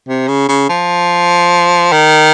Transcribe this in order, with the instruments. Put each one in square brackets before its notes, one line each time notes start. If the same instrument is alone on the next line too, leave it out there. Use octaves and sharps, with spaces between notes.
[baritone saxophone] C3
C#3
C#3
F3
D#3